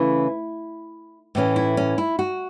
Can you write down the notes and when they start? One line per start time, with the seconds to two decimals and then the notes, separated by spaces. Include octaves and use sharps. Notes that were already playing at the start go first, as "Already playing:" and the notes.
Already playing: C#3 E3 A3 C#4 E4
1.35 A2 E3 A3 C#4
1.56 E4
1.77 C#4
1.98 E4
2.19 F#4